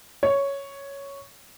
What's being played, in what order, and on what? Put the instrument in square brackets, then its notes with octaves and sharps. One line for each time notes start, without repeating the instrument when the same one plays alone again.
[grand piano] C#5